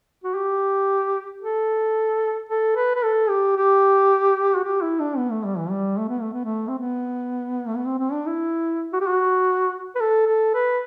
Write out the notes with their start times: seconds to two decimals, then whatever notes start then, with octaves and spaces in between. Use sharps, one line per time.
0.24 F#4
0.35 G4
1.42 A4
2.49 A4
2.76 B4
2.95 B4
3.03 A4
3.29 G4
3.56 G4
4.55 F#4
4.63 G4
4.82 E4
5.00 D4
5.18 B3
5.31 A3
5.44 G3
5.58 E3
5.71 G3
5.98 A3
6.09 B3
6.21 A3
6.33 B3
6.44 A3
6.68 C4
6.78 B3
7.67 A3
7.76 B3
7.86 C4
7.99 C4
8.12 D4
8.26 E4
8.93 F#4
9.01 G4
9.07 F#4
9.95 B4
10.00 A4
10.27 A4
10.54 B4